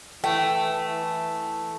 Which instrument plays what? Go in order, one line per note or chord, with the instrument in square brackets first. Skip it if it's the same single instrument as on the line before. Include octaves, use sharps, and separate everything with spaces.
[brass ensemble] E3 [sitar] A3 [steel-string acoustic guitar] G5